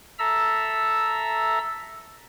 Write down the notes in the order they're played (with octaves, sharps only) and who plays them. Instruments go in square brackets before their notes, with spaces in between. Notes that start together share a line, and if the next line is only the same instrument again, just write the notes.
[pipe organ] A4 E5 A#5 E6